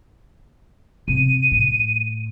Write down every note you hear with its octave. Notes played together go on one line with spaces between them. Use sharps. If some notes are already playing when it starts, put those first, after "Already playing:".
C3 D#7
A2